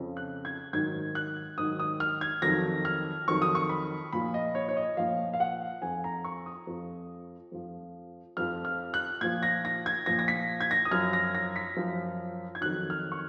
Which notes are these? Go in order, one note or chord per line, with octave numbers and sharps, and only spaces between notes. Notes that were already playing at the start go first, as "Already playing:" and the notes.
Already playing: F2 C#3 F3
F#6
G#6
G#2 D#3 F#3 G#6
F#6
G#2 D#3 F#3 D#6
D#6
F6
G#6
F2 D#3 F#3 A#6
F6
F2 D#3 F#3 C#6
D#6
C#6
B5
A#2 F3 B5
D#5
C#5
C#5
D#5
A#2 F3 F5
F5
F#5
F2 F3 G#5
A#5
C#6
D#6
F2 F3
F2 F3
F2 F3 F6
F6
F#6
A#2 F3 G#6
A#6
A#6
G#6
A#2 F3 A#6
A#6
B6
G#6
A#6
D#6
F#2 F3 F6
A#6
A#6
B6
F#2 F3
G#6
F2 D#3 F#3 F#6
F6
C#6